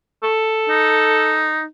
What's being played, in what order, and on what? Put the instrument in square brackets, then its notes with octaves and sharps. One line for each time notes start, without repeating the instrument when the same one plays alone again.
[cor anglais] A4
[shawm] D#4